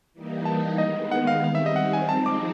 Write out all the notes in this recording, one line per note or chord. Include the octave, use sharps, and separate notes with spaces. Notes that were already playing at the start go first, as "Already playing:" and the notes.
E3 G3 A#3 D#4
A5
D#3 G#3 B3 D#5
F#5
F5
D#3 G3 C4 F5
E5
D#5
F#5
G#5
F3 G#3 C4 D#4 A5
D6